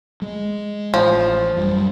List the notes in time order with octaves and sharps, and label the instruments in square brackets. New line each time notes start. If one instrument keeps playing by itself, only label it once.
[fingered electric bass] G#3
[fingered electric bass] A1 [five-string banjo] F3
[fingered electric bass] F#2 G3